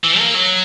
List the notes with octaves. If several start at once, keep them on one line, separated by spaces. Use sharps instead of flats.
E3
A#3
F#3